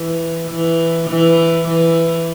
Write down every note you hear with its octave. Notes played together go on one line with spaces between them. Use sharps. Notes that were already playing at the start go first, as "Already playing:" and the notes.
Already playing: E3
E3
E3
E3